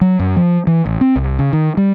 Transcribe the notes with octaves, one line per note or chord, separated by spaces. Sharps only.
F#3
F#2
F3
E3
A1
C4
C2
C#3
D#3
G3